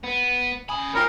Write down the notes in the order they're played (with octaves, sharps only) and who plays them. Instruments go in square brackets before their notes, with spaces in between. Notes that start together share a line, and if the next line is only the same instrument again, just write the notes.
[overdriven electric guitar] B3
[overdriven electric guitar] C#4 B5 [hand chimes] G#5 D#6
[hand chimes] F4 G#5 [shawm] A#4 [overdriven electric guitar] C#5 G5